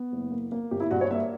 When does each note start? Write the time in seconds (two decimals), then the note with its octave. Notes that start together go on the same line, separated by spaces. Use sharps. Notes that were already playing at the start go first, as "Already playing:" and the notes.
Already playing: B3
0.12 F#1
0.31 A#3
0.52 A#3
0.71 G1 G4
0.80 E4
0.91 G2 F#4
1.01 C#5
1.11 A#3 E5